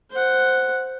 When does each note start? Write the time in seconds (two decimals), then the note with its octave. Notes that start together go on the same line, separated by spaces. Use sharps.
0.11 C5 F#5